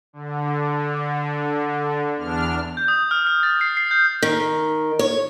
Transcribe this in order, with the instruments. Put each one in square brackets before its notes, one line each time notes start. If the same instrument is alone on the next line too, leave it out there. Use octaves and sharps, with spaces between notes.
[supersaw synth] D3
E2 D4 F6
[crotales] G6
D#6
F6
F6
A6
C7
C7
G6
[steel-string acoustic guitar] D#3
C#5